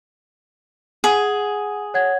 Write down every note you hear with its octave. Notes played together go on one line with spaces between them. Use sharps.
G#4 F#5
C#5 F#5 G#6